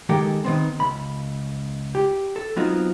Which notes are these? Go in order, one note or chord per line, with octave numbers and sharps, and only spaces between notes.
D#3 G#3 G4 A4 A#4 G5
D#3 B3 C4
C#2 B5
G4
A4
F#3 B3 C4 D#4 F4 F#4